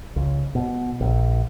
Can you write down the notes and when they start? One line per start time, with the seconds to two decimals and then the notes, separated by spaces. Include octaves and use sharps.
0.16 C#2
0.55 B2
1.01 A#1